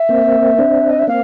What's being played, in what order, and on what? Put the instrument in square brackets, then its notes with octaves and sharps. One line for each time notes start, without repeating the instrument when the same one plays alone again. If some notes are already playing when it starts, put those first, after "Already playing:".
Already playing: [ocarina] E5
[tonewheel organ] A#3 C4
C4 D4
[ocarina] D#5
E5
[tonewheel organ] A#3 C4 [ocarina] F5